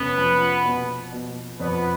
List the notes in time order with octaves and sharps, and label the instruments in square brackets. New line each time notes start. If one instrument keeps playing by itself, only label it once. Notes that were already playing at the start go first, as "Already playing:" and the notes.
Already playing: [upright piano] F1 C#4 [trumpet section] B3 B4
[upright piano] F3
B2
B2
[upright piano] F2 [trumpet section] B3 B4